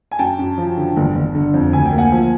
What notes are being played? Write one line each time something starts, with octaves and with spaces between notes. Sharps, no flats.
G#5
F#2 G5 A5
F#2
F3
D3
G1
G1
D3
F2
D2 G#5
G5
A#3
F#5 G#5
F3